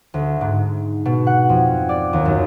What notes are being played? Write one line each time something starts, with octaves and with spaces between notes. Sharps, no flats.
D2
G#2
B2
F#5
F2
D5
D#2
F#2